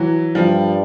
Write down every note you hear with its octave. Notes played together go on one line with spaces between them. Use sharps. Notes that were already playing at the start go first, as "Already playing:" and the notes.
Already playing: E3 F#3
G2 F3 G3